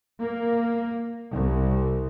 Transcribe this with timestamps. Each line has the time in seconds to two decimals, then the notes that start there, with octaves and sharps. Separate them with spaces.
0.19 A#3
1.32 C2